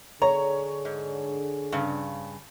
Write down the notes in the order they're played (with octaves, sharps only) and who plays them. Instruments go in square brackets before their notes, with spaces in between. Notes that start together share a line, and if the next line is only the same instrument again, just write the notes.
[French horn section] D3 G#4 [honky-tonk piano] C#5 [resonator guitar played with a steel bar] A#5
[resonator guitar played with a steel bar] G#2
G2 C#3